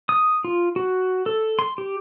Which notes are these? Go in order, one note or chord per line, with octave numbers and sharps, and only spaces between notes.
D#6
F4
F#4
A4
C6
G4